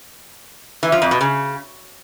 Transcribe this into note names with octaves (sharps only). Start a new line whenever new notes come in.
E3
F3
F2
B2
C#3